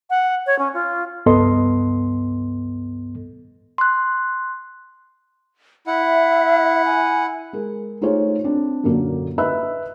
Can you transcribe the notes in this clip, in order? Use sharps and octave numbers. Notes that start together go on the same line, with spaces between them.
F#5
C#5
C#4
F4
C#2 G2 B3 A4 D#5 C6
C6 F#6
E4 E5 F#5
G#5
G#3 A#4
A3 D#4 F4 G#4 C5 C#5
C4 D4
F#2 A#2 D3 F#3 A#3
B4 D#5 E5 B5 E6 F#6